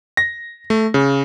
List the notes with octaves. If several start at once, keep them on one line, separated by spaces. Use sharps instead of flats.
A#6
A3
C#3